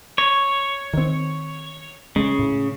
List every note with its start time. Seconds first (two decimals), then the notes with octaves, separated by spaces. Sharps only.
0.18 C#5
0.93 D#3 C4
2.16 C#3 G#3
2.39 A2